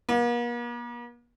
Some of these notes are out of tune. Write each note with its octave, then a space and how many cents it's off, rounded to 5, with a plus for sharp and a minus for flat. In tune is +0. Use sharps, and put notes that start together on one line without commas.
A#3 +45